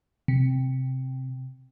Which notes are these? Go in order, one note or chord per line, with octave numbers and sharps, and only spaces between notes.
C3